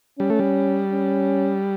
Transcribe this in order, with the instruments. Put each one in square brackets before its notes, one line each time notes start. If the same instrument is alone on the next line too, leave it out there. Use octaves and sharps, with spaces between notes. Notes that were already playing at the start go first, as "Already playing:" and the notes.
[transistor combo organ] G3 [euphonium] C#4
[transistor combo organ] A3
G3
[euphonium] C#4